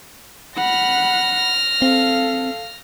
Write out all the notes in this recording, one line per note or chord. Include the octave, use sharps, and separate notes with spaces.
F#5 B5 F6 A#6
C4 A4 F5